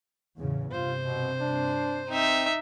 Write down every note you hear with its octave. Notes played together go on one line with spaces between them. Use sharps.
E2 A2 C#3
G2 C3 F4 C5
B2
D4
C4 D#4 E5